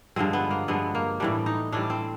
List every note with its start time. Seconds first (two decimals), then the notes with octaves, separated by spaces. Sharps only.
0.16 G2 D3 F3 G#3 C4
0.33 B3
0.51 A#3
0.68 G2 D3 F3 G#3 B3
0.95 A#3
1.20 A2 E3 G3 D4
1.46 D#4
1.72 A2 E3 G3 D4
1.90 C4